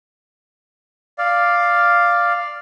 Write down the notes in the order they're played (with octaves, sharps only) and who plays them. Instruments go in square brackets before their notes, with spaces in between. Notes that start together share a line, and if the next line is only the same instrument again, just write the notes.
[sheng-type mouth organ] D5 F5